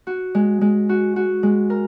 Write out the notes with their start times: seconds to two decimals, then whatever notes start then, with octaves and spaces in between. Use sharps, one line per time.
0.07 F#4
0.35 G#3
0.61 G#3
0.89 F#4
1.16 F#4
1.43 G#3
1.70 A#4